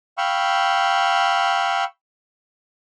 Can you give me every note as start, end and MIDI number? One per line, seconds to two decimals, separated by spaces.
0.18 1.84 77
0.18 1.84 79
0.18 1.84 83
0.18 1.84 85
0.18 1.84 88